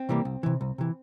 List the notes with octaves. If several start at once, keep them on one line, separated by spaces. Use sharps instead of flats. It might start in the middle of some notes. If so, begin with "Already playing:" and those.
Already playing: C4
C3 E3 G3 A#3
C2
C3 E3
C2
C3 E3